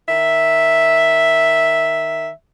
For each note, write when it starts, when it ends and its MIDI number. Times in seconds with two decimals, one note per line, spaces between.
0.09 2.29 51
0.09 2.29 76